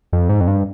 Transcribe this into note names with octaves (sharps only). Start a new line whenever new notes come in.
F2
G#2
F2
G2